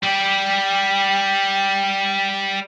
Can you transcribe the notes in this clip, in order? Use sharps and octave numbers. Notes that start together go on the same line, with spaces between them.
G3 D5 G5